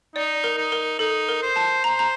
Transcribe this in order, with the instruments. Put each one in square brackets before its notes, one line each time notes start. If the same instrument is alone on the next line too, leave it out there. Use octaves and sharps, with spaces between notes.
[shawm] D#4 [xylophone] D5
[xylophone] A#4
[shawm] D#4
[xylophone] A#4
[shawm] D#4 [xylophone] A4
[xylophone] A#4
[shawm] C5
[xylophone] A5
[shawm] C5 [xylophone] A#5
[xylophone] A#5